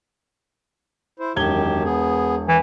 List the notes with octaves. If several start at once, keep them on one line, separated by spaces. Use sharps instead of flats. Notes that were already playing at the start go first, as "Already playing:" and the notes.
E4 C5
E1 F#2 D#3 G4 G#6 G7
B3 G#4
E3